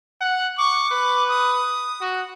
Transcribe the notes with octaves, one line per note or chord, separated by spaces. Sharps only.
F#5
C#6 D6
B4
D#6
F#4